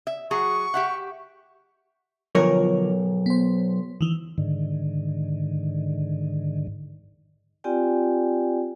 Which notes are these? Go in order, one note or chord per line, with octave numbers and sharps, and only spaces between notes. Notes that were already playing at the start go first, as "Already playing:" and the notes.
E5
F#3 F#4 G#4 C#6
G4 E5 F#5
B1 D3 F3 F4 A#4 C#5
B3 C5
D#3 E3
G#2 D3 D#3
C4 F4 G4 D5 G5 G#5